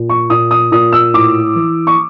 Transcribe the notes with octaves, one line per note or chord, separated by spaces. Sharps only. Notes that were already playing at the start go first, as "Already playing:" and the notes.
Already playing: A#2
C#6
A#2 D#6
D#6
A#2 D#6
E6
A2 D6
E3
C#6